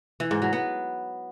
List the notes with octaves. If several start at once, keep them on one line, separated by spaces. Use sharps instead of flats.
E3
G#2
F#3
B3